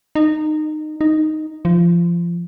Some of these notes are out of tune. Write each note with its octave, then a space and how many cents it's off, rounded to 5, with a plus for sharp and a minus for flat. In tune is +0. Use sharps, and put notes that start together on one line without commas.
D#4 -20
D#4 -5
F3 -25